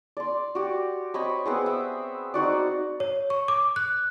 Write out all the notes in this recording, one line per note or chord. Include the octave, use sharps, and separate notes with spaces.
D5 C6
F#4 G4
C4 C#5 D#5 B5
B3 C4 G#4
E5
C4 D#4 F#4 D5
C#5
C#6
D6
F#6